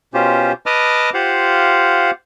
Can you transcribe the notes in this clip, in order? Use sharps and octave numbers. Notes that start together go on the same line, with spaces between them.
B2 C#4 F4 G4 C5
B4 D#5 A5 D6 D#6 F6
F4 G4 C5 F5 F#5